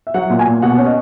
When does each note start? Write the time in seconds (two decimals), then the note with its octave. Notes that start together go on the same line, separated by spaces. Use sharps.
0.07 E5
0.14 F#3 F#5
0.30 A#2
0.39 G#5
0.47 A#2
0.62 B2 F#5
0.78 C#4
0.86 D#5